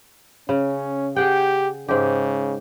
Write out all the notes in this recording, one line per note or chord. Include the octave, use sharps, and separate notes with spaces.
C#3 C#4
G4 G#4 F#5 G5
G#2 C#3 G4